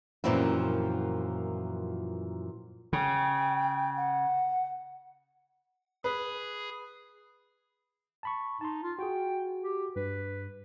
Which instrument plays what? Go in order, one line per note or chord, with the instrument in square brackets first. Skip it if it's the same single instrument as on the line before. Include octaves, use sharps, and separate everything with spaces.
[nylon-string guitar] F#2 A#2 E3 F3 C4 E4
[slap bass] C#3 [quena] G5
[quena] F#5
[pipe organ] G#4 [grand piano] B4
[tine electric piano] A5 B5 C#6
[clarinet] D#4 [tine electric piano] A5 C6
[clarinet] F4
[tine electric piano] F#4 G#4 [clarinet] G5
[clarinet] G4
[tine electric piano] G2 [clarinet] B4